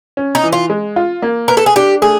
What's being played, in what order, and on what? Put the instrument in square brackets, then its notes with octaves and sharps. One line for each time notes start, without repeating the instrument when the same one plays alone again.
[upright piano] C#4
[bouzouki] D#4
[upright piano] E3
[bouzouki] F4
[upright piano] G#3
F4
A#3
[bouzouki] A#4 [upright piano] B4
[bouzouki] A4
G#4
[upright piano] D4 [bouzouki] G4
[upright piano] A3 [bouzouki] G#4